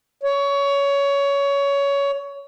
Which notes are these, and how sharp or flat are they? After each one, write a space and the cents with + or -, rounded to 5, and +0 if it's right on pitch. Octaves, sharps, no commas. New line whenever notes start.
C#5 +20